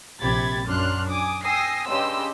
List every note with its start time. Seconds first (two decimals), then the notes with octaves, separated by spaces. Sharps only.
0.21 A#1 C3 G4 B5 G#6 A6
0.66 F#2 D4 C6 F6 F#6
1.08 G#5 D6 D#6
1.44 G5 G#5 D#6 E6 A#6 C7
1.89 G2 C#3 G4 D#5 C6 E6